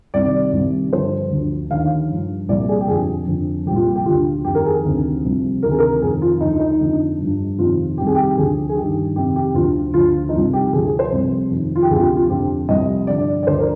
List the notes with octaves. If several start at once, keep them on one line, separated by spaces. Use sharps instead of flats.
C2 C3 D#3 D5
C2 C3 D#3
G2 D3 F3 C5
D2 D3 F3
D#2 D3 F3 F5
G2 F3
C2 A#2 F3 D5
G#4
G4
F2 D3 F3 G#4
F2 D3 F3
C2 A#2 F3 G4
F4
G4
G4
D2 D3 F3 F4
F2 D#3 G4
A#4
G#4
D2 C3 D#3
C2 C3 F3
D2 C3 D#3 A#4
G#4
A#4
F2 D#3 G#4
F4
D2 D3 F3 D#4
D#4
F2 D3 F3
G2 F3
F2 C3 D#3 F4
C2 C3 D#3 G4
G#4
G4
D2 D3 F3 G#4
G#4
G2 D#3 G4
F2 C3 D#3 G4
G4
D2 D3 F3 F4
D2 D3 F3 F4
D#4
C2 C3 F3 F4
G4
D2 D3 F3 G#4
G#4
C5
C2 C3 F3
F2 D#3
F4
G4
D2 C3 F3 G#4
F4
G4
F4
F2 D3 F3 G4
C2 C3 F3 D#5
G2 D3 F3 D5
D5
D2 D3 F3 C5
A#4